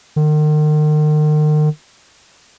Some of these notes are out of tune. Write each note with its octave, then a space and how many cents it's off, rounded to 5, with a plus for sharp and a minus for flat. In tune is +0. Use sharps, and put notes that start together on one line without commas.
D#3 -40